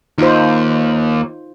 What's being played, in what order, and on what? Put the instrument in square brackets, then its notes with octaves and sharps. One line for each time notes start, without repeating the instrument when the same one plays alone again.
[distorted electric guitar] D#2 [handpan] D#4 F4 C5